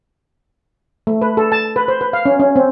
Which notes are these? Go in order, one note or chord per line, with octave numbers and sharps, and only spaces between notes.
A3
B4
A4
A5
B4
C5
B4
F5
C#4
C#4
C4